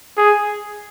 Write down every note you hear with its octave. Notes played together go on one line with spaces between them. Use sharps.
G#4